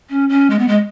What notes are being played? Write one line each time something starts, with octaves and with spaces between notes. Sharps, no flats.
C#4
C#4
G#3
B3
G#3